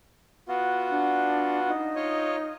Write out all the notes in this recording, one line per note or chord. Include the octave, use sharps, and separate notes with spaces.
B3 F4 F#4
D4
D#4
F4 C#5 D#5